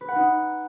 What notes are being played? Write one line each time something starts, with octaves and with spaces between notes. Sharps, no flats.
B4
F#5
D#4